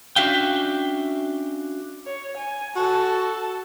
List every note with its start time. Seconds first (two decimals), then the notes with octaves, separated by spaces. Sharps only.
0.16 C#4 D4 F#4 E5 F5 G5
2.06 C#5
2.37 G#5
2.76 F#4 A4 A5